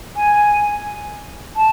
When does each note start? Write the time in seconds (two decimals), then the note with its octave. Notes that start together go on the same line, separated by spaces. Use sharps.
0.16 G#5
1.56 A5